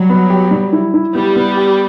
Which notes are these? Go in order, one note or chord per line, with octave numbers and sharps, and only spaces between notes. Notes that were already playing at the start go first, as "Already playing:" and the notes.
Already playing: F#3 G3
B3
G4
G3
E4
E4
G3 B3
B3
G4